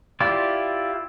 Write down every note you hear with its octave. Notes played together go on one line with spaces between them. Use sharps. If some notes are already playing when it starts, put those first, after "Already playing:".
E4 F4 G4 D5